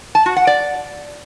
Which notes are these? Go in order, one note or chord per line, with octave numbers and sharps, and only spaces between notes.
A5
F#4
F#5
D5